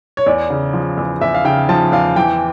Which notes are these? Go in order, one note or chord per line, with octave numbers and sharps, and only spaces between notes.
C#5
E2 D5
C#3
F3
E2
E2 E5
F5
C#3 G5
F3 A5
E2 F5
E3 G5